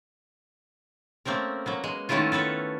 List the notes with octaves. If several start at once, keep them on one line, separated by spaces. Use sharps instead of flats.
A3 A#3 C4 C#4 A#4
F#3 A#3 B3
G#3
D#3 A3 B3 C#4 E4 F4
B3 A4 B4 C#5